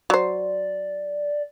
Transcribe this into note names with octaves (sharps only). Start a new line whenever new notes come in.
F#3 C5 D5